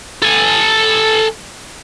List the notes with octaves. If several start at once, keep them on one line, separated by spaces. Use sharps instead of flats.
A4 G#5